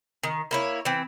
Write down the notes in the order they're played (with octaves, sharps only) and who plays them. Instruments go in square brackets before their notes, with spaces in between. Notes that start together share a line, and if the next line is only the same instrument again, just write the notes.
[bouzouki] D#3
A#3 E4 C#5
E3 C4